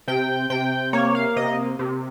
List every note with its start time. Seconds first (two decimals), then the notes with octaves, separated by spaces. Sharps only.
0.08 C3 G5
0.50 C3 G5
0.93 A#3 C#5
1.15 F5
1.36 C3 D#5
1.79 C3